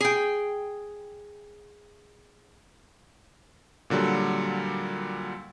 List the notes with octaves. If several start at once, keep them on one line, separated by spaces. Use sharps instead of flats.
G#4 G5
A#2 D3 F#3 G3